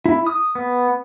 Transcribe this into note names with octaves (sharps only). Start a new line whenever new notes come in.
E4
D#6
B3